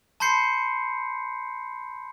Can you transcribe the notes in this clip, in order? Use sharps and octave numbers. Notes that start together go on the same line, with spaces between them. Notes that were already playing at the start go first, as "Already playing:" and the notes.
A5 B5 C6 G6 C7 C#7